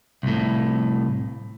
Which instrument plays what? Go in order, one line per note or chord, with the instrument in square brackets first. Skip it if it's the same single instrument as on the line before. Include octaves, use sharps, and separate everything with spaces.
[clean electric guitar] C2 A2